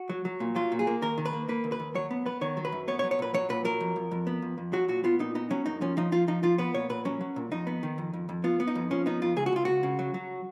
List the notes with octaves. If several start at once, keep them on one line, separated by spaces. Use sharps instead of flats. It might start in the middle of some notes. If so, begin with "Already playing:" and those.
Already playing: F#4
F#3
F#3
A#2
F#3 F4
A#2
G#4
A#3
D#2 A#4
D#3
B4
A#3
A#3 B4
D#2
B4
D#2
F#3 C#5
B3
B3 B4
D#3 C#5
F#3
B4
F#2
B3 C#5
C#5
F#3
C#5
A#2 B4
F#3 C#5
A#2 B4
F#3 A#4
F2
F2
F2
B3
F2
F2
F#3 F#4
A#2 F#4
B3 F4
A#2 D#4
B3 D#4
F#3 C#4
F#2 D#4
F3 C#4
F3 D#4
F3 F4
F3 D#4
F3 F4
B3 B4
A#2 C#5
A#2 B4
F#3 C#4
F#3
A#2
F2 D#4
B3
D#3
F2
F2
F2
B3 F4
B3
D#4
F2
F3 C#4
B3 D#4
F2 F4
C#2 G#4
F#4
C#2 F4
C#2 F#4
C#3
F#3
F#3